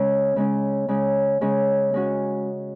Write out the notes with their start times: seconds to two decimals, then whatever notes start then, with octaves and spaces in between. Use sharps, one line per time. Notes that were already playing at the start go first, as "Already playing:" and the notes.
Already playing: C#3 G#3 C#4
0.36 C#3 G#3 C#4
0.88 C#3 G#3 C#4
1.41 C#3 G#3 C#4
1.94 G#3 C#4 F#4